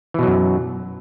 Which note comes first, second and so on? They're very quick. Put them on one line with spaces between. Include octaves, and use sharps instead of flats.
E3 B2 F#3 F#2